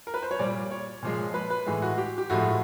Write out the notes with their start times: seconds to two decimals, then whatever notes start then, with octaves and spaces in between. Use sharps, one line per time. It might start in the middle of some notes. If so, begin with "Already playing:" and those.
0.07 A#4
0.14 B4
0.23 C5
0.31 C#5
0.39 A#2 G3 D5
0.71 C#5
1.03 A#2 F3 G#3
1.34 B4
1.50 B4
1.66 A2 E3 G#3
1.82 F#4
1.98 G4
2.18 G4
2.30 A2 F3 G#3 F#4